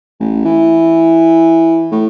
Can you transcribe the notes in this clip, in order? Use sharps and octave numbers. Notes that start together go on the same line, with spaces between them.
A1
E3
A2